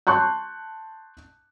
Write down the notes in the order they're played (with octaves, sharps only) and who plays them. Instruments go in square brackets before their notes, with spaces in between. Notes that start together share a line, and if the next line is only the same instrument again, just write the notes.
[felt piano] A5 C6 C#6 F#6 G6